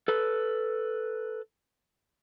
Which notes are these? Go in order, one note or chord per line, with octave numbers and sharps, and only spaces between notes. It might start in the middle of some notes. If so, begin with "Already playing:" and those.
A4 B4